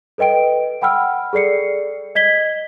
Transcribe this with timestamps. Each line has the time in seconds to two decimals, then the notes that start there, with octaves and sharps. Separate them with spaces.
0.18 A4 B4 D#5 G5 D7
0.82 F#5 G5 B5 E6 F6
1.33 G#4 A4 D5 C7 C#7
2.15 D#5 G#6 B6 G7